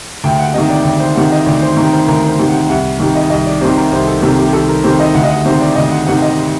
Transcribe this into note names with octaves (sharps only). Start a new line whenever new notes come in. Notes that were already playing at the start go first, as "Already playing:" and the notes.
D2 G5
F#5
C3 D#3 D#5
D5
D2 D5
C5
C3 D#3 F#5
D#5
D2 D5
C5
C3 D#3 A#4
C5
D2 A#4
C5
C3 D#3
F#5
C2 F#5
C3 D#3
D#5
C2 D#5
D5
C3 D#3 C5
A#4
C2 C5
A4
C3 D#3 A4
G4
C2 A4
A#4
C3 D#3 C5
D#5
D2 F#5
D#5
F#5
C3 D#3 C5
D5
D2 D#5
F#5
C3 D#3 F#5
D#5